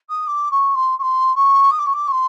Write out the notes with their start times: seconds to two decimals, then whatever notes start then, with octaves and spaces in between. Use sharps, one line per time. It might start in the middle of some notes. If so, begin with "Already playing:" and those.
0.09 D#6
0.27 D6
0.51 C#6
0.75 C6
0.99 C#6
1.02 C6
1.36 C#6
1.71 D#6
1.78 D6
1.86 C#6
1.93 D6
2.07 C#6
2.12 C6